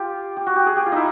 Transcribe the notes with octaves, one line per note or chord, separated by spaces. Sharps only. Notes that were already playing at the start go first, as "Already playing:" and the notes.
Already playing: F4 G4
G4
F#4
G4
G#4
G4
F4
D#4 E4